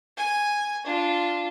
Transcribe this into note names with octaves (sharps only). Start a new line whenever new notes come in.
G#5
D4 F4